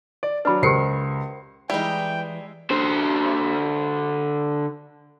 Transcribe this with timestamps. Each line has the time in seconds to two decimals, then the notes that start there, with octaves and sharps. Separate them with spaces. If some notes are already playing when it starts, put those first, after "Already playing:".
0.23 D5
0.45 F#3 D4 B4 B5
0.62 C#2 G4 A#4 C5 C7 C#7
1.70 E3 G3 G#3 D#4 E4 G5
2.71 D3 C5